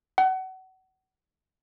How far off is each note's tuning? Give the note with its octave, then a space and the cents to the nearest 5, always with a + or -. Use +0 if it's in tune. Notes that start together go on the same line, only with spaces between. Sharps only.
F#5 +30